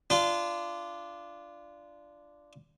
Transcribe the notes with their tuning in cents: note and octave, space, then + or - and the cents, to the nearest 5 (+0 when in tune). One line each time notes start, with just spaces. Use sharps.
D4 +0 F4 -20